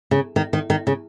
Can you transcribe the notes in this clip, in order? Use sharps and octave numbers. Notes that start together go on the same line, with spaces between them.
C#3
D#3
D#3
D#3
C#3